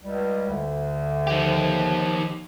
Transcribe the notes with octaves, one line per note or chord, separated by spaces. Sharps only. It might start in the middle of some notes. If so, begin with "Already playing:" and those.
C#2 G3
D2 D3
D#3 F3 G4